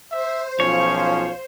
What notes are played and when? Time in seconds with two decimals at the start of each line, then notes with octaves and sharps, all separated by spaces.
0.11 C5 E5
0.60 B1 F3 C#4 F4 C#5